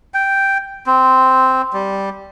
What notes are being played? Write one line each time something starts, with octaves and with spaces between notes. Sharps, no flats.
G5
C4
G3